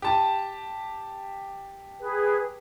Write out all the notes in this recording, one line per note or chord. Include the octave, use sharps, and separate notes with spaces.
G4 A5
G#4 B4